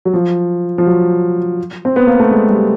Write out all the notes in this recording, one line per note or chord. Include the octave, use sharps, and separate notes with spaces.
F#3
F3
F3
F#3
C4
B3
A#3
A3
G#3
G3